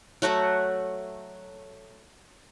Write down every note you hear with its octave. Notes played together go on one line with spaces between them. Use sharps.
F#3 A3 F#4 F#5